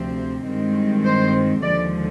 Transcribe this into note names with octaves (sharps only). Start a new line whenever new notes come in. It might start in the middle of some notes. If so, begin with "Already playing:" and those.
Already playing: D2 C3 F3 C4
G2 D#3 G#3 C4
C5
D#2 D3 F3 G#3 D5